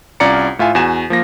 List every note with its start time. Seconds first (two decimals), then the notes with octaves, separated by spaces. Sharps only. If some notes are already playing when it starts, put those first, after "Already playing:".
0.20 C2 C#4 F4 D5 A#5 C#7
0.59 A2 F4 E5 G#5
0.75 E2 F#4 G#5 E7
1.10 F3 A#3 A#6